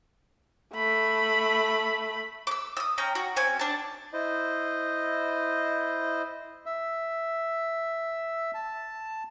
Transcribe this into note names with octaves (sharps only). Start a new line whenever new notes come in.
A3 B5
D6 E6
D#6 E6
C#4 G5 A#5
F#4
C4 C#4 G#5
D4 A5
E4 C5 D#5
E5
A5